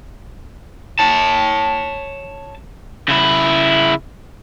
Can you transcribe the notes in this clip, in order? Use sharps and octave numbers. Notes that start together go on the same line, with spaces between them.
C#5 A5
C#3 E4